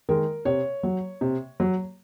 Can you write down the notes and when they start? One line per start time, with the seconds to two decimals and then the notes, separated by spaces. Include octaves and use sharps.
0.09 D#3 G#3 A#4
0.45 C3 C#5
0.83 F#3
1.21 C3
1.60 F#3